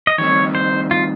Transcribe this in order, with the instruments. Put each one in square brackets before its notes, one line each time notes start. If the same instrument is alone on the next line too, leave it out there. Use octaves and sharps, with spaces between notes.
[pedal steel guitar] D#5
[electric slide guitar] D#3 G3 C4 [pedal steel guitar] C#5
[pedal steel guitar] C5
F4